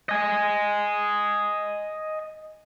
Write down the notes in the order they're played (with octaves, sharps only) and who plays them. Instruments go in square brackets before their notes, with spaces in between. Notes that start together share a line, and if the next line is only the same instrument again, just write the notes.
[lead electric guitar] D#5 G#5